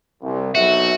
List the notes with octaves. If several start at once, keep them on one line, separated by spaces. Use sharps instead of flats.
C2
B1 F#4 E5